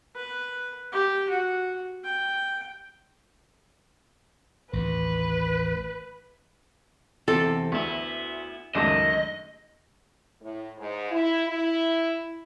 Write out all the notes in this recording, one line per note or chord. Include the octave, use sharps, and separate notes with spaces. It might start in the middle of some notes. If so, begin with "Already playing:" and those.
B4
G4
F#4
G5
A1 D#2 B4
E2 C3 C4 A4
D2 B3 E4
C#2 F#2 D#3 A3 D4 D#5
A2
G#2
E4
E4